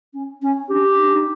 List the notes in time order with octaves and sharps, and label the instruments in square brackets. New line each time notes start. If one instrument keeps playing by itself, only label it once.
[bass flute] C#4
C#4
[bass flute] D4 [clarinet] G4
[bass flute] D#4
D4
D#4